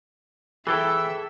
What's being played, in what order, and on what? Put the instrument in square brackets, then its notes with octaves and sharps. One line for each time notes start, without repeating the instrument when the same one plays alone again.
[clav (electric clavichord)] E3 [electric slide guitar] G#4 A4 G5 [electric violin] E5